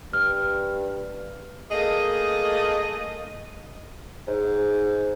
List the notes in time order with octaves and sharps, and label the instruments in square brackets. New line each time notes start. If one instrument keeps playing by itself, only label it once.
[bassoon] G2 [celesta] F6
[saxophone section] A3 A#3 G#4 D#5
[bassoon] G#2